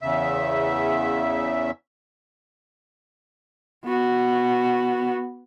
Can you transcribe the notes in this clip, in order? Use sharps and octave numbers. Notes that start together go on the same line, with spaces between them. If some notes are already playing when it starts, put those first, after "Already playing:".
E2 C#3 E5
B3 F#4